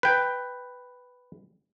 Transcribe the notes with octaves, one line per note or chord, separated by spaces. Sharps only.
B4 G5